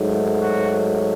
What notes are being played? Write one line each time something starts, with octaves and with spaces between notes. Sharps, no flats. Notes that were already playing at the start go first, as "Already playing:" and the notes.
Already playing: G#2 F#3 A3
F#4